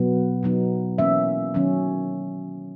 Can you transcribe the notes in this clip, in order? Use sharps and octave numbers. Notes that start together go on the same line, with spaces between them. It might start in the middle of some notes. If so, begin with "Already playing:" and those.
Already playing: B2 F#3 B3
B2 F#3 B3 D#4
E3 A#3 C#4 E5
D#3 F#3 C#4